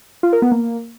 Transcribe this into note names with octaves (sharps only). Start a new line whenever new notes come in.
F4
A#4
B3
A#3